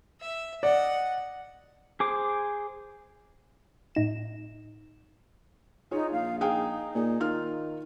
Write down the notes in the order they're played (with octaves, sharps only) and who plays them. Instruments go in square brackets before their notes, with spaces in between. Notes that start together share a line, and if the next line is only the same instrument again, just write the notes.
[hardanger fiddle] E5
[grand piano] D5 [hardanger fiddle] D#5 F#5
[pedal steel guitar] G#4 C5 D6
[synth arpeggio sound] A2 D#4 E7
[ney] D#4 [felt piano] F4 G#4 C#5
[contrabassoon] A#1 [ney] F5
[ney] D#4 [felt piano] G#4 F5 G5
[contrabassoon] A#2 [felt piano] G#4
[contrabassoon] D#3 [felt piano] F4 F5 F6